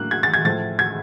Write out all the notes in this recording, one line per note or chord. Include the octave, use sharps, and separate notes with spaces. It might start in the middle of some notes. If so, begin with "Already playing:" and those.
Already playing: A2 F#3 A#3 D4 F#6
G#6
A6
G#6
A2 F3 A3 A6
G#6